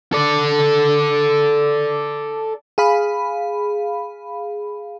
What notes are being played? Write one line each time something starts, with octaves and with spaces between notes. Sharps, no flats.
A4 D5
G#4 F5 B5